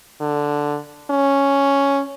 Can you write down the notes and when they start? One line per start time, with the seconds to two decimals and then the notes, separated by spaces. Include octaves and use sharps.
0.21 D3
1.10 C#4